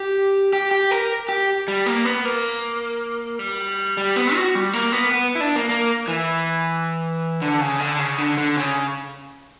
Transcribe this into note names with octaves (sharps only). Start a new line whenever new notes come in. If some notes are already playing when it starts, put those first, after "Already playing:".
Already playing: G4
G4
G4
A#4
G4
G3
A#3
B3
A#3
G3
G3
B3
F#4
G3
A#3
B3
B3
E4
D4
A#3
A#3
E3
D3
C#3
D3
C#3
D3
D3
C#3